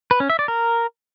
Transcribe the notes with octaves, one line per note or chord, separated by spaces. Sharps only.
B4
C#4
E5
D5
A#4